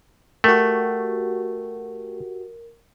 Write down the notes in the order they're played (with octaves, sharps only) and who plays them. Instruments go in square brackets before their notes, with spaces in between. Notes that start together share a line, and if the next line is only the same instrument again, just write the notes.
[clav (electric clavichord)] A3 [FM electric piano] F#4 G4 [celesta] A#4